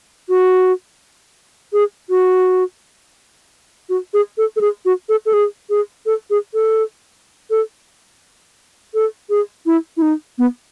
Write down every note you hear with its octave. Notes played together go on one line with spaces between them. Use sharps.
F#4
G#4
F#4
F#4
G#4
A4
A4
G#4
F#4
A4
A4
G#4
G#4
A4
G#4
A4
A4
A4
G#4
E4
E4
D#4
B3